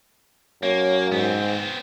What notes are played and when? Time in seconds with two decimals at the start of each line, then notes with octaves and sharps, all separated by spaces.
0.63 F#2 A#3 C#5
1.12 G#2 B3 C4